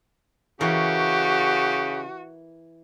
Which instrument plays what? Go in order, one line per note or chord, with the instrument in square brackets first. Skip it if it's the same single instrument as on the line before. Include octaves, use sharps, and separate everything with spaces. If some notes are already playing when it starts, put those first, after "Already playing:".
[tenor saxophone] C#3 [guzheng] E3 A#4 [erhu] F#4 [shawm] G4